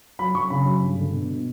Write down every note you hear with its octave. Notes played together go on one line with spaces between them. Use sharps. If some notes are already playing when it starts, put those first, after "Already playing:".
F#3 B5
F#2 C#6
C#3 B5
F#3
G2
D3
B2
B2